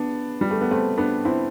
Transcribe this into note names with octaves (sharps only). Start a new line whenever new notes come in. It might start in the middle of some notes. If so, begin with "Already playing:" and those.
Already playing: B3 D4
G3
A3
B3
A3 C4
B3 D4
C4 E4